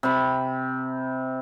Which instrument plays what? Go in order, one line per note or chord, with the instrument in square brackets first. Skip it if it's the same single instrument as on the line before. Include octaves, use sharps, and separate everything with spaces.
[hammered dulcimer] C3 B5